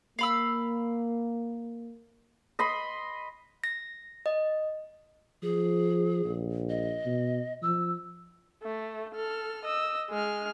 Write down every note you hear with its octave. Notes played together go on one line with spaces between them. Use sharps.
A#3 F5 B5 E6
D#5 B5 C6
A#6
D#5
F3 G#4
A#1
D#5
B2
F3 E6
A3
A4 F6
D#5 E6
G#3 F6